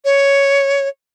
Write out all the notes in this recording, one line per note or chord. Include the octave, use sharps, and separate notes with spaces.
C#5